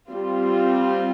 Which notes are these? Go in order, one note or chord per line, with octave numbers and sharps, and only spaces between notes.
G3 C4 F4